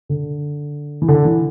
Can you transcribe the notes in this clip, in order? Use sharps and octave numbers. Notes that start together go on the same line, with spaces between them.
D3
E3
D3
E3